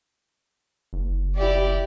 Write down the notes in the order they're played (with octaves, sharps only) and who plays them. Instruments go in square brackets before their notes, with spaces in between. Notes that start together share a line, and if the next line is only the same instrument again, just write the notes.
[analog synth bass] F#1
[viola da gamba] E4 G4 D5